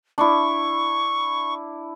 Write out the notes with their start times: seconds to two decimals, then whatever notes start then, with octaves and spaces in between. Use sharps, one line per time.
0.18 D4 E4 C#6